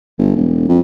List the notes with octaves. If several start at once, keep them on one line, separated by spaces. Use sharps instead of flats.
G1
E1
F2